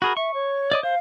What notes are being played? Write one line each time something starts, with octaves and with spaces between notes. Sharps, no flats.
F#4 G#4 A#4 B5
E5 C#6
C#5
D5 D#5 D6
C5 F5